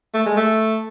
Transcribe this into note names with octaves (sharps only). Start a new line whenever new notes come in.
A3
G#3
A3